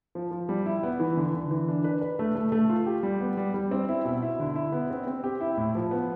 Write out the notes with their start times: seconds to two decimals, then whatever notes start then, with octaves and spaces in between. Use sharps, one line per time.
0.15 F3
0.31 F3
0.49 G3
0.66 E4
0.83 B3
1.00 E3
1.17 D3
1.34 D3
1.51 E3
1.68 D4
1.84 B4
2.01 B4
2.19 A3
2.35 A3
2.52 A3
2.69 F4
2.86 G4
3.03 G3
3.21 B3
3.37 G3
3.54 G3
3.71 C4
3.89 E4
4.05 B2
4.22 E4
4.40 D3
4.56 E4
4.72 B3
4.90 C4
5.07 C4
5.24 G4
5.41 E4
5.57 A2
5.75 F3
5.91 B3